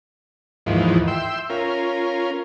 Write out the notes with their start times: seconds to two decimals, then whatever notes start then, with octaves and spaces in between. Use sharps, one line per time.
0.66 D#2 G#2 E3 F3
1.08 E5 G5 C6 E6
1.50 C#4 F4 A#4